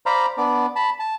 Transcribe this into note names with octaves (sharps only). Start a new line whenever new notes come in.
C5 D5 F5 A#5 B5
B3 D4 D5
A5 B5
A5